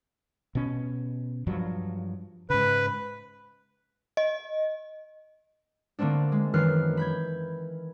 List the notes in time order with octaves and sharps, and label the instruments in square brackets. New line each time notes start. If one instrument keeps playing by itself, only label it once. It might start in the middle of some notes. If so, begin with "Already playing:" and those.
[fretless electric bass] B2 C#4
G2 F3 F#3
[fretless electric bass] G#2 C#3 [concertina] B4
[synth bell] D#5
[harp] D3 A3 A#3 C4 D4
G#3
F#2 D#3 E3 F6 F#6 C7
B5 G6 G#6